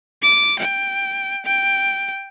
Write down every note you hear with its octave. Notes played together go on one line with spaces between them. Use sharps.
D6
G5
G5